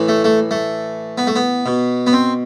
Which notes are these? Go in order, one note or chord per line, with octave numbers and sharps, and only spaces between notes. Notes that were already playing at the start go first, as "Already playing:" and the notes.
Already playing: A2 E3
A3
A3
A3
B3
A3
B3
B2
B3
C4